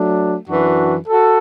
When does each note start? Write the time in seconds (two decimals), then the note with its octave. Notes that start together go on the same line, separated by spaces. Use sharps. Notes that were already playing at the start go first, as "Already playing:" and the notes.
Already playing: F#3 A3 D4
0.49 F#2 E3 D4 F#4
1.09 F#4 A4